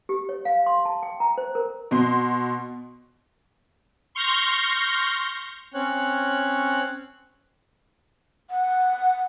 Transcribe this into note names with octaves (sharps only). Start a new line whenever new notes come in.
G4
C#5
F5
C6
A5
G5
A#5
C5
A#4
B2 C6
C6 C#6 F6 G6 A#6
C4 C#4 C#5 F#6
F#5